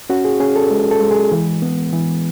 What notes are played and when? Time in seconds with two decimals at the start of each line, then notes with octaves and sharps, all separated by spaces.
0.10 C#4 F#4
0.25 G#4
0.40 C#4 G#4
0.56 A4
0.71 G#3
0.91 A4
1.01 G#3
1.11 G#4
1.32 E3
1.62 B3
1.93 E3